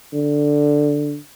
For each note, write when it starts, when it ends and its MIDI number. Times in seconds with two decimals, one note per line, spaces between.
0.13 1.16 50